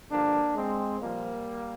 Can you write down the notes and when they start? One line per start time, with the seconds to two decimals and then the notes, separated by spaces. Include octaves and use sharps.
0.10 G2 D3 F3 A#3 D4
0.56 G#3 C4
1.01 A#2 F3 G3 A#3